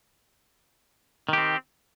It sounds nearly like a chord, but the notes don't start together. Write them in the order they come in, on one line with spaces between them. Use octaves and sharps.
D#3 G4 C4